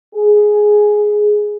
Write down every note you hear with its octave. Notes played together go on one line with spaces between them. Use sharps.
G#4